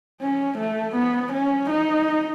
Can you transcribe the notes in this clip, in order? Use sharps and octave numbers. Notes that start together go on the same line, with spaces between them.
C#4
A3
B3
C#4
D#4